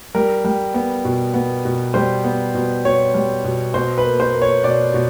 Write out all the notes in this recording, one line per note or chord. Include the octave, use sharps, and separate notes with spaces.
G3 A#4
G3
B3
B2
B3
B2
G3 C5
B3
B2
B2 C#5
G3
B2
B2 C5
B4
A#3
C5
A#3
C#5
B2 D5
B2